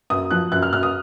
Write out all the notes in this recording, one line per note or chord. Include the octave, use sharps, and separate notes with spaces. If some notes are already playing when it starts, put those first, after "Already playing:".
F#2 D#6
F3 F#6
F#2 F#6
F6
F#2 F6
D#6